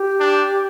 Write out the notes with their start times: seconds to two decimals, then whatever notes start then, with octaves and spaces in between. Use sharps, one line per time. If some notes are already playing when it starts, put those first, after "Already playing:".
Already playing: G4
0.20 D4